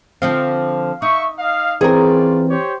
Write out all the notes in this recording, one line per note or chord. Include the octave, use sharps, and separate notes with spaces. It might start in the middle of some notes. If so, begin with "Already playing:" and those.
D3 F3 C4 F5
D#4 E5 C#6
D#5 F5
E3 C4 C#4 F4 G#4 A#4 D5
G4 C5 C#5